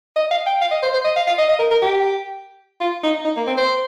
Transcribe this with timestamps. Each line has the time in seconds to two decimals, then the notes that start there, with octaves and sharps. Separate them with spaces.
0.16 D#5
0.31 F5
0.46 G5
0.61 F5
0.71 D#5
0.82 C5
0.93 C5
1.04 D#5
1.16 F5
1.27 F5
1.38 D#5
1.48 D#5
1.59 A#4
1.71 A#4
1.82 G4
2.81 F4
3.03 D#4
3.25 D#4
3.36 A#3
3.47 C4
3.57 C5